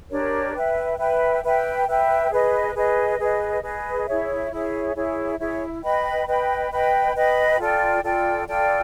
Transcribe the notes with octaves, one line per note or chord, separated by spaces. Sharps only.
D4 G4 A#4 C#5
B4 E5 G5
B4 E5 G5
B4 E5 G5
B4 E5 G5
G#4 B4 D#5
G#4 B4 D#5
G#4 B4 D#5
G#4 B4 D#5
E4 G#4 C#5 E5
E4 G#4 C#5 E5
E4 G#4 C#5 E5
E4 G#4 C#5 E5
B4 D#5 G5 B5
B4 D#5 G5 B5
B4 D#5 G5 B5
B4 D#5 G5 B5
F4 A4 D5 G5
F4 A4 D5 G5
F4 A4 D5 G5